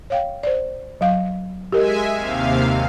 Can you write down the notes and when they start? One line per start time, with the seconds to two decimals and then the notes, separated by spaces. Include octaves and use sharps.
0.10 C#5 F5 G5
0.43 C5 D5
1.01 F#3 F5
1.72 G#3 G4 A#4 D#5 E5 G#5
2.14 D#2 C3 F5